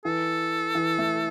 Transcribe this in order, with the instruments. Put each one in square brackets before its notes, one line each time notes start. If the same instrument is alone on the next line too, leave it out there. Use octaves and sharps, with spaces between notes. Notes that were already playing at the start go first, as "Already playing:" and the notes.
[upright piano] E3 [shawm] A4
[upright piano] E3
A3